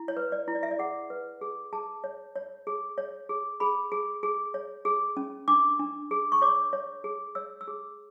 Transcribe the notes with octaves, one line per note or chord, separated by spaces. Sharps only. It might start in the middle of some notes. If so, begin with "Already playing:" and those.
Already playing: E4
C#5
B4
D5
E4
D5
E5
D5
G#4 F#5
B4
G#4
G#4 A5
C#5
C#5
G#4
C#5
G#4
G#4 B5
G#4
G#4
C#5
G#4
C#4
D4 D6
D4
G#4
C#6
C#5 D6
C#5
G#4
C#5 E6
E6
G#4